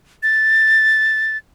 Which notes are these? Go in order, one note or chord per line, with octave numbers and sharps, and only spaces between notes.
A6